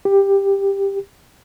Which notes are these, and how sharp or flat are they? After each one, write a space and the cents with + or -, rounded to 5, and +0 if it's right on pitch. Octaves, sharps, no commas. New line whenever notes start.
G4 +10